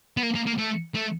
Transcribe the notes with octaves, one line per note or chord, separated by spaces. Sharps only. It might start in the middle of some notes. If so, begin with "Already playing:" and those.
B3
A#3
A#3
A#3
A3
A3